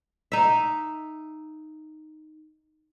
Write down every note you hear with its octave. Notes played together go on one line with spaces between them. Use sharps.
D#4 E5